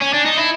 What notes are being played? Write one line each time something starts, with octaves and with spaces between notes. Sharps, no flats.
C#4
D4
D#4
E4